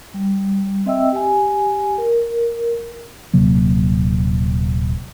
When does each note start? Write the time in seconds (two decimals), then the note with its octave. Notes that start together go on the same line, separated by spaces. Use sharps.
0.14 G3
0.86 C4 D#5 E5 G5 E6
1.13 G4 G#5
1.98 A#4
3.34 D#1 C3 F#3 A#3